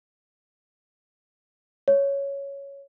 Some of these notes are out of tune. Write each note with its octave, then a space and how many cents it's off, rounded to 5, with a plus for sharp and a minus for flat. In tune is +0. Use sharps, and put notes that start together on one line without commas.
C#5 +5